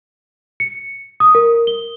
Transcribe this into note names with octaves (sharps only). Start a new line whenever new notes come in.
C#7
D#6
A#4
G7